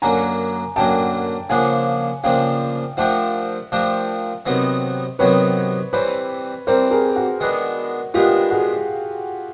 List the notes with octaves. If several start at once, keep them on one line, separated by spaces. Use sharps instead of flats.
F#2 D3 F#3 A#3 G#5 A#5
F#2 D3 F#3 A#3 G5 A5
C#3 F3 A#3 D4 F#5 G#5
C#3 F3 A#3 D4 F5 G5
F3 A3 D4 G4 A#4 E5 F#5
F3 A3 D4 G4 A#4
C3 D#3 F#3 B3 D#4
C3 D#3 F#3 B3 D#4 B4 C#5
E3 G3 C4 B4 C#5
E3 G3 C4 A#4 C5
G#4 A#4
F#4
D#3 G#3 B3 D4
D#3 G#3 B3 D4 F4 G4
F#4 G#4